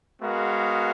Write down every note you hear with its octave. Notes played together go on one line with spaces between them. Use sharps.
G#3 B3 F#4 A#4 F5